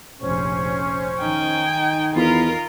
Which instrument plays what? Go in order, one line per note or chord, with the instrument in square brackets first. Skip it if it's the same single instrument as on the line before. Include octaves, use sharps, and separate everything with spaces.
[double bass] F1 A#1 [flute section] C#4 C5 C#6
[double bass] D#3 D#4 [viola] G5 G#5
[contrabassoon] E2 [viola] F4 A#4 [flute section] B5